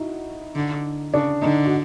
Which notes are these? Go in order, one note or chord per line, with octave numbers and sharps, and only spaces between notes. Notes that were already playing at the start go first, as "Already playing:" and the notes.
Already playing: D#4 E4 F#4
D3
C#3 D4
D3 D#4
F#4